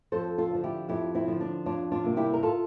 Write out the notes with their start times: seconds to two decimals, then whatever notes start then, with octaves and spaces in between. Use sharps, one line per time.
0.12 F2 A4 C5
0.38 F4 A4
0.51 D3 F3
0.64 E4 G4
0.89 F2 E4 G4
1.14 C4 E4
1.27 D3 F3
1.41 D4
1.66 F2 D4 F4
1.92 D4 F4
2.04 C3 G3 A#3
2.17 E4 G4
2.34 A#4
2.43 F4 A4